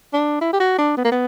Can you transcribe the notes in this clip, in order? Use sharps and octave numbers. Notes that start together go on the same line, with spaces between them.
D4
E4
G4
F#4
D4
B3
A#3
B3